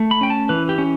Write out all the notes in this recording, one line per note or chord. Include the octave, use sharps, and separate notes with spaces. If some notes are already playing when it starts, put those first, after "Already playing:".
Already playing: A3
B5
C#4 G5
A5
E3 B4
G4
C#4